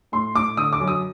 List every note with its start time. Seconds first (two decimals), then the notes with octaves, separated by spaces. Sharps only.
0.12 A2 C6
0.34 A2 D6
0.57 D3 D#6
0.73 D6
0.80 F#2
0.88 D#6